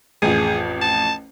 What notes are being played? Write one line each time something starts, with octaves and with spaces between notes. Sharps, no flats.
A1 F2 G#4
A5